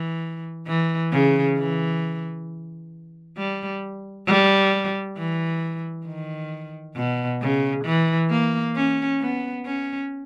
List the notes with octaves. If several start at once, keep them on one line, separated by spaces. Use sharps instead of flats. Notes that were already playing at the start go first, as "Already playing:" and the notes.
Already playing: E3
E3
C#3
E3
G3
G3
E3
D#3
B2
C#3
E3
A#3
C#4
B3
C#4